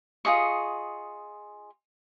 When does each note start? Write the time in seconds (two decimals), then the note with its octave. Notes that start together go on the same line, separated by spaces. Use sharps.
0.25 F4 G#4 D#5 C#6